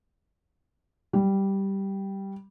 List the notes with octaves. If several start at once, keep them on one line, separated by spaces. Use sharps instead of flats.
G3